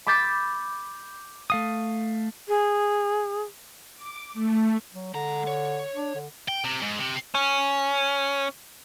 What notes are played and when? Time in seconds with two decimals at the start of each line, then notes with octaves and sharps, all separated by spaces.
0.07 B5 D6 E6 G6 A6 B6
1.50 A3 F5 D#6
2.48 G#4
3.96 D6
4.34 A3
4.94 F#3
5.14 D3 G#3 A#5
5.47 C#5
5.94 D4
6.15 D3
6.48 G5
6.64 C3
6.82 G#2
6.99 C3
7.35 C#4